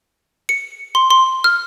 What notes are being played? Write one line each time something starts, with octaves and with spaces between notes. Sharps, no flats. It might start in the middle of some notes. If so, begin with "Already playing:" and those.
C#7
C6
C6
F6